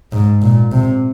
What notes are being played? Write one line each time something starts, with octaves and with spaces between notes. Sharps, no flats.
G#2
A#2
C3